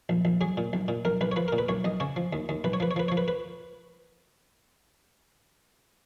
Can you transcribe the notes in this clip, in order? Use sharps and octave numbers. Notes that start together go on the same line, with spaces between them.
A#1
A#1
F#3 G#4
A#2
B1
A#2
B1 A#4
B1 B4
C#5
F3 B4
A#4
A#2
B4
B1 C#5
B1 D#5
C#3 C#5
F3
D#2
D#2
B1 B4
C#5
F3 B4
C#5
F3 B4
F3 C#5
B4
B4